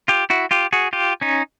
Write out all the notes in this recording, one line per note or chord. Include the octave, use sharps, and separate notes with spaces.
F4 G4
E4 F#4
F4 G4
F#4 G#4
F4 G4
C#4 D#4